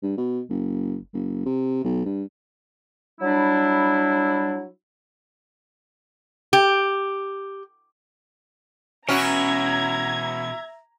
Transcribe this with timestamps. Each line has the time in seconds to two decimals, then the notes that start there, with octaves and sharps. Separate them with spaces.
0.03 G2
0.17 B2
0.49 F#1
1.13 F#1
1.46 C3
1.84 B1
2.05 G2
3.20 F#3 G3 D4 E4
6.53 G4
9.09 B2 E3 C#4 F#4 E5 A#5 G#6